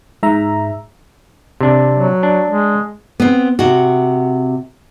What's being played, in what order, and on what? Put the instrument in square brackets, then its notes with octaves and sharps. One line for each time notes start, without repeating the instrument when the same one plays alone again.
[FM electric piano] G#2 E5 A#5
[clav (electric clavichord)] C3 D4
[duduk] F#3
[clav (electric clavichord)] D4
[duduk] G#3
[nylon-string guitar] B3 C4
C3 F#4